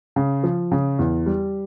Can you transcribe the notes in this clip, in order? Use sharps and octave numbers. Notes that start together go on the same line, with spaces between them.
C#3
F3
C#3
E2
G3